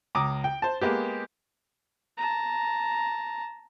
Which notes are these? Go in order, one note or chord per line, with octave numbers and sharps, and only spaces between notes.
C#2 A#5 D6 D#6
G5
C5 A5
G#3 A#3 B3 G4
A5 A#5